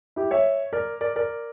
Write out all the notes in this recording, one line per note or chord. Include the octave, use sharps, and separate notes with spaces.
E4 G4
C#5 E5
A#4 D5
A#4 D5
A#4 D5